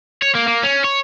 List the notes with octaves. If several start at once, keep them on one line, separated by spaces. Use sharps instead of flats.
C#5
A#3
A#3
C#4
C#5